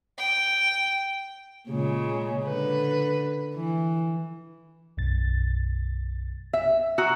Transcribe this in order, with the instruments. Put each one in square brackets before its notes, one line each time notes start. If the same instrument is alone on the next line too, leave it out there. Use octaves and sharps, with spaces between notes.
[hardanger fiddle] G5
[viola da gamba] A#2 C#3 G#3
D3 B4
E3
[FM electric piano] B1 F#2 A6
[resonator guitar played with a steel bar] E5
[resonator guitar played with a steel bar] F#4 [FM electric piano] A#5 D#6 E6